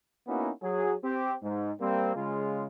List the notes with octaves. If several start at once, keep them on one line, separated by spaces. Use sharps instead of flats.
A#3 B3 C#4 D#4 E4 F#4
F#3 G#4
C4 G4
G#2
G3 A#3 C4
C#3 G#3 F4